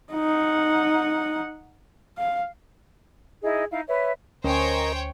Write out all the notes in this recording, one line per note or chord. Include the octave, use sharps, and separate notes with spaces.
D#4 F#5
F5
D#4 E4 G#4 D#5
D#4 E4 F5
B4 C#5 E5
D2 C#4 A#4 C5 C#5 D#5 G5 A#5